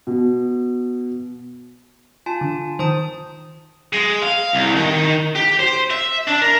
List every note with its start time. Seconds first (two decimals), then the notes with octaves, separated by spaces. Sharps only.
0.07 B2
2.26 F4 G#5 A5
2.41 D3
2.79 D#3 C5 A5 D#6
3.93 G#3
4.22 F5
4.53 C2
4.77 D#3
5.35 G4
5.59 C5
5.90 E5
6.27 D4
6.41 A#4